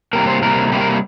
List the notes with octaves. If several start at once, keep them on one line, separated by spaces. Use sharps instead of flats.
C3 G3 A#3 A#4
C5
C3 G3 A#3 A#4
C3 G3 A#3 G4
A#4